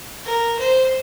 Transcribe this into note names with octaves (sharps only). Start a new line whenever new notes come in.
A#4
C5